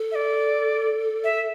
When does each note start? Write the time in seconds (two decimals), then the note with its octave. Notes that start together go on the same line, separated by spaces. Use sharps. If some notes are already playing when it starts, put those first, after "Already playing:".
Already playing: A4
0.12 E5
0.15 D5
1.24 E5